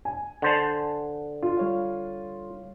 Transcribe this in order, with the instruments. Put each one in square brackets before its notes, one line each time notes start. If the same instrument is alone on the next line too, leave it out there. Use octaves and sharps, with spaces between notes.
[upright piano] G#5
[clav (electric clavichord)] D3 C5 A5 [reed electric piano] F#5
[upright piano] F4
[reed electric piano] G3 C#5 F5